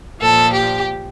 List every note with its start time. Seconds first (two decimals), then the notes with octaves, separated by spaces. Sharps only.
0.21 A#2 F3 A4
0.53 G4